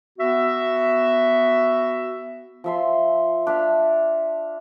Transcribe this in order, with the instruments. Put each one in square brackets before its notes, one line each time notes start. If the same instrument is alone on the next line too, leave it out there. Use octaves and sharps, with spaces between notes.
[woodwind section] B3 F#4 E5
[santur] F3 E5 C6
D4 E5 F5